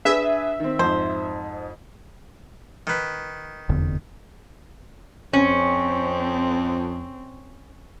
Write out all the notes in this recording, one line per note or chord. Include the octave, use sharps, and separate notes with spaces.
D4 G#4 B4 E5
D#3 C4
F2 G#2 C5
D#3 B4
F1 E2 D3
F2 C4 C#4